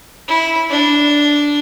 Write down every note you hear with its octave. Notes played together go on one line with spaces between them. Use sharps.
E4
D4